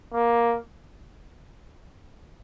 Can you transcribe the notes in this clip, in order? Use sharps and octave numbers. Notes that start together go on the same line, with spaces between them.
A#3